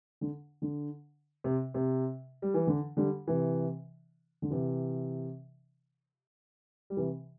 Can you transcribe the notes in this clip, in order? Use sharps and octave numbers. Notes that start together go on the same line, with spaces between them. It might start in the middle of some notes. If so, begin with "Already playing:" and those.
D3
D3
C3
C3
G3
E3
D3
D3 G3
C3 E3
D3
C3 E3
G3
C3 E3